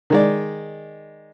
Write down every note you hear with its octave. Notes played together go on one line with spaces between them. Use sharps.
D#3 G#3 D5